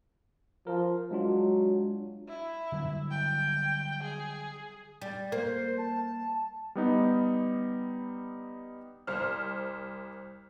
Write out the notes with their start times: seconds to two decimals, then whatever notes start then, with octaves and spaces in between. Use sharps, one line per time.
0.67 F3 A#4
1.11 F#3 G#3 D4 F4
2.28 E4
2.72 D3 F#3 G3
3.11 G5
4.03 G#4
5.02 G3 D5
5.32 A#3 C5
5.77 A5
6.75 G3 B3 D#4
9.07 C2 C5 F6